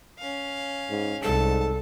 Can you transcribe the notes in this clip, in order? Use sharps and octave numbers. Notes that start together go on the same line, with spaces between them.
C#4 F5
G#2
C2 G#2 A4 A5